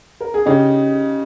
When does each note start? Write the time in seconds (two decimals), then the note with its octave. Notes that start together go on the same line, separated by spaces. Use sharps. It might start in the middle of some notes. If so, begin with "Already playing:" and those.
0.20 A#4
0.34 G#4
0.46 C#3 D#4 G4